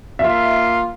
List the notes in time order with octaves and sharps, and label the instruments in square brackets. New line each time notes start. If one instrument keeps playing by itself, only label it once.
[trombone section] A#3 F4 [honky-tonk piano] E5